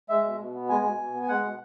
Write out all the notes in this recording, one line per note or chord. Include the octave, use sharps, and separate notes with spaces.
G#3 E5
B2
B2
B3
G#3 G#5
B2
B2
B3
G#5
G#3 F#5
B2